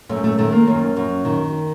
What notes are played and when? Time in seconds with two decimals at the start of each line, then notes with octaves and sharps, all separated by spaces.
0.09 F#2 A3
0.24 A3
0.38 D#3 A3
0.53 A#3
0.67 F#2
0.97 F#2
1.25 D#3